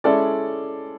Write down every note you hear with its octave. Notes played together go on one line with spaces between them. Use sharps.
G#3 C#4 E4 A4 D5